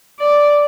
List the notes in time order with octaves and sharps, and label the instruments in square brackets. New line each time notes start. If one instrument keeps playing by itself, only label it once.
[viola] D5